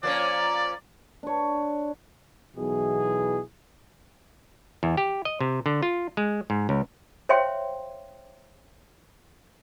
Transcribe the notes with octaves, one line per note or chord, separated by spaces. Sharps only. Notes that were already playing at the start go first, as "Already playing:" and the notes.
F3 A#3 C#4 D5
D4 C#5
B1 B2 E3 E4 G#4
E2
G4
D#5
C3
D3
F4
G#3
G#2
C#2
C5 C#5 E5 F5 G5 C6